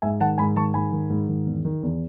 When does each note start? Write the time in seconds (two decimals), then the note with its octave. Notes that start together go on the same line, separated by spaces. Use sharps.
0.02 G#2 E5 G#5
0.20 D#3 F#5 A5
0.38 G#2 G#5 B5
0.56 D#3 A5 C#6
0.74 G#2 G#5 B5
0.92 D#3
1.10 G#2
1.28 D#3
1.46 E2
1.65 D#3
1.83 E2